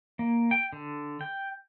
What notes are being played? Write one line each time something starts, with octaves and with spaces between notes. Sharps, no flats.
A#3
G5
D3
G5